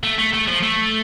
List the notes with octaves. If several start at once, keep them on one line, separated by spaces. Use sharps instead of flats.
A3
A3
A3
F3
A3